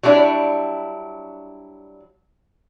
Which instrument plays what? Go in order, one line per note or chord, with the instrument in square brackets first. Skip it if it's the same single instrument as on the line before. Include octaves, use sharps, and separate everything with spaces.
[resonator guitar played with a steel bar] F#3 G3 D4 E4